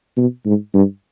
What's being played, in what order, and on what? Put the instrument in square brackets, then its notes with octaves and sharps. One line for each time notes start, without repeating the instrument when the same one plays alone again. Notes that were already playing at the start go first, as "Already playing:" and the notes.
[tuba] B2
G#2
G2